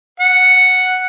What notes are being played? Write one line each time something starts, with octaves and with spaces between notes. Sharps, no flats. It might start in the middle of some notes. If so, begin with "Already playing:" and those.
F#5